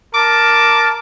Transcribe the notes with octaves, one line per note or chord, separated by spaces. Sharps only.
A#4 A5 D6